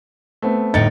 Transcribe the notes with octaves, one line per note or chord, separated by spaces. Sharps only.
A3 B3 C4
G1 A2 D#4 A6 C#7